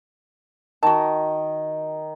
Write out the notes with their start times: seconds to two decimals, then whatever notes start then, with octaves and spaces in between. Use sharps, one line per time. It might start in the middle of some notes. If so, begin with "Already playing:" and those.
0.83 D#3 F#4 A5